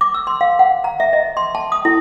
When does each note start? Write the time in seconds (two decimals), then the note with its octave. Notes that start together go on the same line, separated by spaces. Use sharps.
0.01 D6
0.14 E6
0.27 C6
0.41 F5
0.59 F#5
0.84 A#5
1.00 E5
1.13 D#5
1.37 C6
1.55 A5
1.72 D#6
1.85 E4